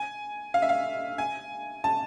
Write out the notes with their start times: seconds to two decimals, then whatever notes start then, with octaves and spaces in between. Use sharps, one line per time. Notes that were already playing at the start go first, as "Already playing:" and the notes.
Already playing: G#5
0.54 F5
0.62 E5
0.69 F5
1.18 G#5
1.84 A5